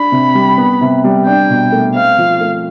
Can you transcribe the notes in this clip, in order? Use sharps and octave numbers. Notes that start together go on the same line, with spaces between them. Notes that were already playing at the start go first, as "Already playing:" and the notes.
Already playing: D4 B5
C3
G3
B3
C3
G3
D4 G5
B2
A3
C4 F5
F3
A3